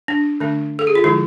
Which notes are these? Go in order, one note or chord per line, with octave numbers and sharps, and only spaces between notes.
D4
D3 A3 D4
A4
G#4
F4
D3 F3 G#3 E4